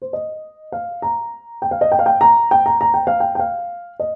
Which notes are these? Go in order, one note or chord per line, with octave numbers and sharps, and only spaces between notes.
C5
D#5
F5
A#5
G5
F5
D#5
G5
F5
G5
A#5
G5
A#5
A#5
G5
F5
G5
G5
F5
D#5